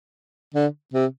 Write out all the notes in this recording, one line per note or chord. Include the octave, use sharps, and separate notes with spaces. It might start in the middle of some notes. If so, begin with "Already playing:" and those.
D3
C3